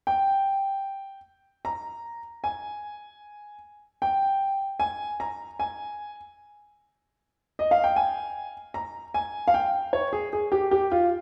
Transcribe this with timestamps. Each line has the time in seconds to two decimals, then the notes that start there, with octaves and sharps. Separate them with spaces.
0.07 G5
1.65 A#5
2.44 G#5
4.02 G5
4.80 G#5
5.20 A#5
5.60 G#5
7.59 D#5
7.71 F5
7.84 G5
7.96 G#5
8.74 A#5
9.14 G#5
9.48 F5
9.54 G5
9.93 C#5
10.13 G#4
10.33 G#4
10.52 G4
10.71 G4
10.92 F4